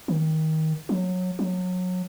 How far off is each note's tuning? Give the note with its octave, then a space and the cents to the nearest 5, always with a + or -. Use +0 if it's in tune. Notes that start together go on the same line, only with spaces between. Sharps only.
D#3 +20
F#3 -20
F#3 -25